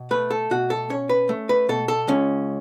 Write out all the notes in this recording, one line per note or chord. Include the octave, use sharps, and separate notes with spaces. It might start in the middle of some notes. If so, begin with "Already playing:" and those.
Already playing: B2
A3 B4
A4
B2 F#4
A4
C#4 C#5
B4
A3
B4
B2 A4
A4
C#2 C#4